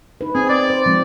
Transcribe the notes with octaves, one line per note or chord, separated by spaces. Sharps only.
D#4 B4
C4 G#4
D5
C5
F3 G#3 C4